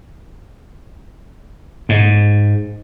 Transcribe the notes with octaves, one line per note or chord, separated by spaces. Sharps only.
G#2